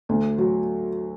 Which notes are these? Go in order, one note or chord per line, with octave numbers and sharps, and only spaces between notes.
D2
F#3